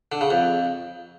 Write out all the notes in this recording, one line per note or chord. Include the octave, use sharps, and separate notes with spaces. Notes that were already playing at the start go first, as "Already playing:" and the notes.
D3
C#3
F2